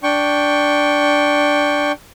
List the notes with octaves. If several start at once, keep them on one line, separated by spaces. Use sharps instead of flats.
D4 G5 C#6